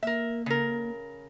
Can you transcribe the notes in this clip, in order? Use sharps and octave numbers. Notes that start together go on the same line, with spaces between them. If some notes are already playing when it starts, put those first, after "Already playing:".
A#3 A#4 E5
C#3 A#4